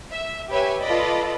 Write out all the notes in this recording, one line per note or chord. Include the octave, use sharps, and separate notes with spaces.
E5
G4 B4 C#5 E5 G#5
F4 A4 B4 D5 D#5 B5